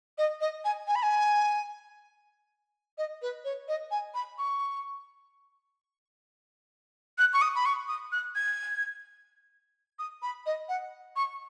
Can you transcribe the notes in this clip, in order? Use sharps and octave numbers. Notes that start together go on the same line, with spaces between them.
D#5
D#5
G#5
G#5
B5
G#5
D#5
B4
C#5
D#5
G#5
B5
C#6
F#6
C#6
D#6
B5
C#6
D#6
F#6
G#6
D#6
B5
D#5
F#5
C#6